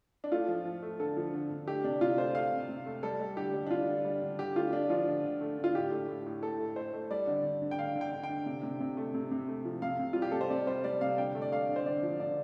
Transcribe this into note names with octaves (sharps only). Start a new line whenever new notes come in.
D4
A3 F4
F3
F3
A3
D3 A4
F3
D3
D3
A3 G4
C3 D4
C3 F4
A3 C5
A3 F5
C3
C3
A3
G3 A4
G3
D3 G4
G3
D4
D3 F4
D3
G3
D3
D3 G4
A3 F4
D3 D4
F3 F4
D3
D3
A3
D3
F4
A2 G4
A3
A2
A2
A2 A4
A3
A3 C5
A3
G3 D5
D3
D3
D3
G5
D3 F5
D3
G5
D3
G5
D3
C3
C3
C3
A3
C3
C3
A3
F3
C3 F5
C3
G3 F4
G4
C3 A4
C5
C3 D5
G3 C5
G3 D5
C3 F5
D3 G5
A3
D5
A3 F5
D3
C5
D3 D5
F3
D3 D5